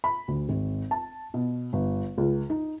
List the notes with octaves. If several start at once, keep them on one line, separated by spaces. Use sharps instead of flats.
B5
D2
G#1
A5
B2
G1
C#2
D#4